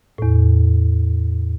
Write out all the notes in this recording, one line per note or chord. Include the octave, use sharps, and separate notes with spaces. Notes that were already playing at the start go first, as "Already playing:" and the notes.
E2 A2